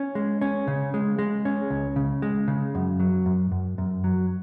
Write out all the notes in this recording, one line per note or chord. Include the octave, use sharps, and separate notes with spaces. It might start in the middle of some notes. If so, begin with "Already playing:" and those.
Already playing: C#4
G#3
C#4
C#3
G#3
G#3
C#4
C#2
C#3
G#3
C#3
F#2
F#3
F#2
F#2
F#2
F#3